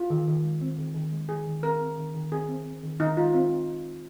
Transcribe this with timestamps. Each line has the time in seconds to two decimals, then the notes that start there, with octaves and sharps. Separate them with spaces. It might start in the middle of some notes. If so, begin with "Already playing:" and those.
Already playing: F4
0.10 D#3
0.27 D#3
0.44 G#3
0.61 C4
0.79 D#3
0.95 D#3
1.12 G#3
1.29 D#3 G#4
1.47 D#3
1.63 C4 A#4
1.81 C4
1.98 D#3
2.14 D#3
2.32 C4 G#4
2.49 C4
2.66 C4
2.83 D#3
3.00 D#3 D#4
3.17 G#3 F4
3.34 C4 F4